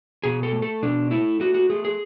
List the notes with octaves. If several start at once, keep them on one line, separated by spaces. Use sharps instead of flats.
B2 G#4
A4
A3
A4
B2 D4
A3 E4
A3 F#4
F#4
A3 G#4
G#4